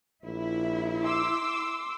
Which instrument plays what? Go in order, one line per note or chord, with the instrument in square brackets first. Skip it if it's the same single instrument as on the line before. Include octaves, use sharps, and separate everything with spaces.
[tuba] A#1 [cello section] E4
[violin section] C6 D6 E6